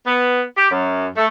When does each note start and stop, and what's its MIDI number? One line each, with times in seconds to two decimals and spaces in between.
0.06 0.42 59
0.56 0.68 67
0.71 1.07 42
1.16 1.26 57